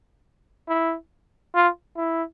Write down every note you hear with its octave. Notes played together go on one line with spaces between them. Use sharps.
E4
F4
E4